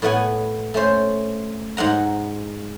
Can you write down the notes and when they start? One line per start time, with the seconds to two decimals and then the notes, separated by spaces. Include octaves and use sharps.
0.02 A2 A3 B3 F#5 G#5
0.74 A3 C#4 C5
1.77 G#2 G#3 F#5 A#5